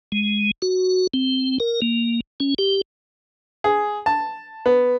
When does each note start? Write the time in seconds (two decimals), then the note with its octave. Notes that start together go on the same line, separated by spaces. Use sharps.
0.12 G#3
0.62 F#4
1.14 C4
1.60 A#4
1.82 A#3
2.40 C#4
2.58 G4
3.64 G#4
4.06 A5
4.66 B3